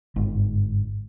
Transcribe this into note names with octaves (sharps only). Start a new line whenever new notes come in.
G1 G#2